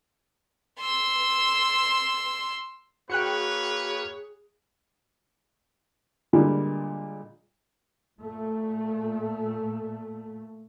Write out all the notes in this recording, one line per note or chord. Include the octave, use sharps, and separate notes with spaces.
C6 E6
A#3 F#4 G#4 B4 C#5 G5 F#6 C#7
A#2 D3 G3 G#3
A#2 A3